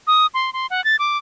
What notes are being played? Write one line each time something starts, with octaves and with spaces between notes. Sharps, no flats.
D#6
C6
C6
F#5
A6
D6